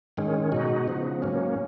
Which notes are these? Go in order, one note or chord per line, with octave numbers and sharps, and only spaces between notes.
G#2 D#3 G#3 C#4
B2 G#3 D#4 F#4
C#3 F3 B3
G#2 F#3 A#3 C#4